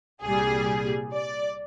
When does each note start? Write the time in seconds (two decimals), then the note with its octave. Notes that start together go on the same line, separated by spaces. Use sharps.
0.22 C2 A#2 G3 G#4
1.13 D5